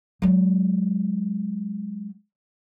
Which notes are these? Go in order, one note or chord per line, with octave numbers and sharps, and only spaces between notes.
F#3 G#3